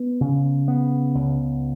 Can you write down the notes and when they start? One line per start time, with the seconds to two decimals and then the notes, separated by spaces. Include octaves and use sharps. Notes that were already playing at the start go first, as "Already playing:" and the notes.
Already playing: B3
0.21 C#3
0.68 B3
1.15 C#2